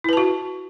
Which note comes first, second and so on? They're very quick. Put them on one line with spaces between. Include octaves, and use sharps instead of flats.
E4 B4 A5 F#4